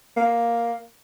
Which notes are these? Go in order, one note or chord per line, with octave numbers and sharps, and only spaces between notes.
A#3